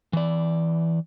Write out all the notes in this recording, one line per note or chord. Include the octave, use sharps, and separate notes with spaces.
E3 D5